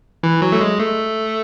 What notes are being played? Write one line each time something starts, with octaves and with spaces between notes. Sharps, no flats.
E3
F#3
A3
G#3
A3